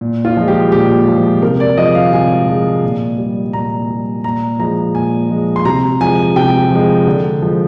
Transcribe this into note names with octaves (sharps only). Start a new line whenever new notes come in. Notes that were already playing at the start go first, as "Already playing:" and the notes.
A#2
F4
F3 G#3
G4
A#2 G4
F3 G#3
C3 A#4
D5
F3 G#3 D#5
F5
C3 G#5
F3 G#3
A#2
G3
A#2 A#5
G3
A#2 A#5
F3 G#3 A#5
A#2 G#5
F3 G#3
C6
C3 A#5
F3 G#3 G#5
C3 G5
F3 G#3
D3
F3 G#3